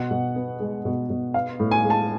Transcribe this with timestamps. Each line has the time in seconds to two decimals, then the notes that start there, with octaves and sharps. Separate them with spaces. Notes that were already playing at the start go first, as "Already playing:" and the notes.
Already playing: B2 F#5
0.11 B2
0.36 B3
0.60 G#3
0.85 B2
1.10 B2
1.34 B3 F5
1.59 A2
1.71 G#5
1.83 G#3
1.90 A5